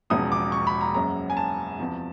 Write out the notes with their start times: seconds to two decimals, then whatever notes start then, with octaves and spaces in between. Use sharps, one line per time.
0.10 E1 E2 C#3 F3 D#6
0.32 D6
0.52 C#6
0.67 B5
0.81 A#5
0.94 F#1 F#2 C#3 F#3 A#5
1.30 G#5
1.37 A5
1.79 E2 C3 F3